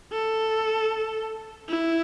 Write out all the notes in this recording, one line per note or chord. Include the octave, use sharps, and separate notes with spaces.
A4
E4